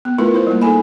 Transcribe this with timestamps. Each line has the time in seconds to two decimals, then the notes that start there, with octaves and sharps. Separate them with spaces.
0.05 B3
0.18 A3 E4 F4 A#4 B4
0.34 E4 A#4 C5
0.47 G3 A#3
0.62 D#4 G#4 A4 G#5 B5